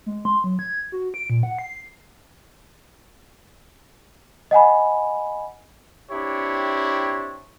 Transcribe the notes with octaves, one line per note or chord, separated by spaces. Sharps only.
G#3
C6
F#3
G#6
F#4
D7
A#2
F#5
C7
D#5 F#5 G#5 B5
C4 D4 E4 G4 C#5